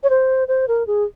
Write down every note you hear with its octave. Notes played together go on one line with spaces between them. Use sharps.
C#5
C5
C5
A#4
G#4